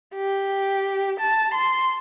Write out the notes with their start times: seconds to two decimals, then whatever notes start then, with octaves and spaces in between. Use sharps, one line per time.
0.16 G4
1.20 A5
1.54 C6